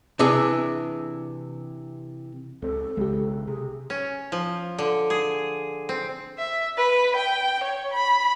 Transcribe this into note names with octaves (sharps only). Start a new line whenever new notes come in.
C3 E3 D4 G#4
C#2 C4 A4
B1 C#3 G#3 G4
C3 G#4
C#4
F3
D3
G#4
C4
E5
B4
G5
C#5
B5